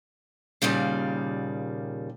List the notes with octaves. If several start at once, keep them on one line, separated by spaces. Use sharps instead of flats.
D#2 A#2 C#3 G3 F5